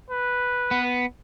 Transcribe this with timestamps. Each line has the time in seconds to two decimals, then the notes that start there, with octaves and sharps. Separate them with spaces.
0.10 B4
0.71 B3